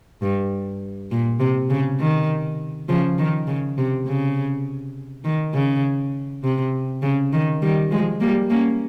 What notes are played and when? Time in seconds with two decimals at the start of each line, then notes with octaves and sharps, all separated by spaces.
0.22 G2
1.11 A#2
1.40 C3
1.70 C#3
2.00 D#3
2.89 C#3 F3
3.18 D#3
3.47 C#3
3.78 C3
4.07 C#3
5.24 D#3
5.54 C#3
6.44 C3
7.02 C#3
7.33 D#3
7.62 D#3 G3
7.91 F3 G#3
8.21 G3 A#3
8.50 A#3 C#4